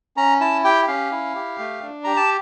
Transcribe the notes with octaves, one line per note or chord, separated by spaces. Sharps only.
C#4 A#5
E4 A5
G4 G5
C#4 F5
E4
G4
A3
D4
G4 A#5
A5